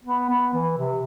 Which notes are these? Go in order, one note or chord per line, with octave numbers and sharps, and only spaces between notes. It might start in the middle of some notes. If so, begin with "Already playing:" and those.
B3
B3
E3
C3